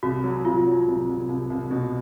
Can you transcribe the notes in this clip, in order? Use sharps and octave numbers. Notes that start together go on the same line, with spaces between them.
C2 F#4
F#3
C2 F4
F#3
C2
C2
C2
C2
B2